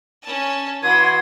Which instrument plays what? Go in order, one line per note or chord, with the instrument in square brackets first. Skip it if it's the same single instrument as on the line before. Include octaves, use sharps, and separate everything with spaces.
[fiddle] C#4 A5
[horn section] E3 F#4 C6 [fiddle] E4 D#6 [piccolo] G#6